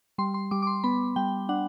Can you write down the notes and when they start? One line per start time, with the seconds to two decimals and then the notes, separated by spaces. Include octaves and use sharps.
0.18 G3 C6
0.34 C6
0.51 G3 D6
0.62 D6
0.67 C6
0.84 B3 B5
1.16 G3 G5
1.49 D4 F#5